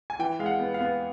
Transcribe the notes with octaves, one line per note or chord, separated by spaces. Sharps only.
G#5
E3 G5
G#3 F5
F#5
B3
F5
B3